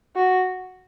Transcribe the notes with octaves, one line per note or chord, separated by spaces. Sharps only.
F#4